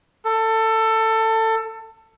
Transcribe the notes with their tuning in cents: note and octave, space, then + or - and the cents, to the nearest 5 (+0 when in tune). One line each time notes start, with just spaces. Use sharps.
A4 +20